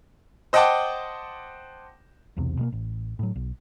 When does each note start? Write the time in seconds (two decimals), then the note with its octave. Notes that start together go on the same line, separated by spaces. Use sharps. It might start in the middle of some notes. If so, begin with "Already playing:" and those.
0.53 C5 D#5 F#5 G5 A5 D6
2.37 E1 B1 E2 C3
2.59 B2 G#3 A#3
2.72 A1
3.19 A2 F#3
3.36 B1